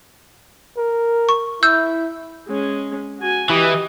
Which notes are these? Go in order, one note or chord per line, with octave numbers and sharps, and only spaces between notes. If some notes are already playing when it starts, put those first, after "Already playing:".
A#4
C#6
E4 E6 G6
G#3 C#4
F#4 G#5
E3 G4 D#5